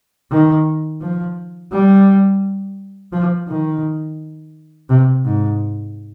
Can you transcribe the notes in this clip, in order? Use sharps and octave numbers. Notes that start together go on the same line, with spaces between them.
D#3
F3
G3
F3
D#3
C3
G#2